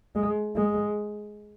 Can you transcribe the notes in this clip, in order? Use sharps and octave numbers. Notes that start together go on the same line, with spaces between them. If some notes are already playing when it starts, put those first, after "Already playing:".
G#3
G#3